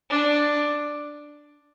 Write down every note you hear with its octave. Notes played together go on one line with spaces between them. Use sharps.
D4